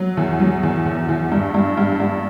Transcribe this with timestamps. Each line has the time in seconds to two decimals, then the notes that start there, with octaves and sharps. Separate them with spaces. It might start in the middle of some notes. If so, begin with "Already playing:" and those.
Already playing: F#3
0.17 E2
0.40 F#3
0.63 E2
0.86 E2
1.08 E2
1.32 G2
1.54 G2
1.77 G2
2.00 G2